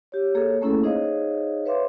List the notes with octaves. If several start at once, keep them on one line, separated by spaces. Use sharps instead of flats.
G4 C#5
A#3 G#4 A4 C#5
A3 A#3 C#4 E4 G#4 A4
D#4 G#4 C5 C#5 D#5 F5
B4 C#5 E5 F5 C6 D6